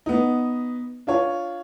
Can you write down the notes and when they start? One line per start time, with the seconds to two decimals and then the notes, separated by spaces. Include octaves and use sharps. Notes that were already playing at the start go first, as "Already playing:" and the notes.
0.06 B3 D#4
1.07 D4 F4 C#5